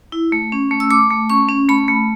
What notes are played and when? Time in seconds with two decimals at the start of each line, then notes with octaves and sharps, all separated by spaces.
0.12 E4
0.32 A3
0.52 C#4
0.71 A3
0.80 E6
0.91 A3 D6
1.10 A3
1.30 C#4 C#6
1.49 C#4
1.69 A3 B5
1.88 A3